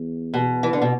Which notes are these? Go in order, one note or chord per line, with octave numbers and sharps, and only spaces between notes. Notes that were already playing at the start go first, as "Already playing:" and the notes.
Already playing: E2
B2
E3
D3
B2